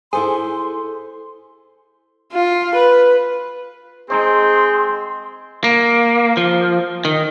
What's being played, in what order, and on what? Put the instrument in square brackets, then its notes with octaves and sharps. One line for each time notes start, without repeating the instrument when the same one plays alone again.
[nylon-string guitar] E4 A4 C5 [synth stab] G#4 [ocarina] C6
[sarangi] F4
B4
[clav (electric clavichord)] G#3 D#4 C5 [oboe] C4 [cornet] G#4 [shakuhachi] C6
[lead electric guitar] A#3
F3
D#3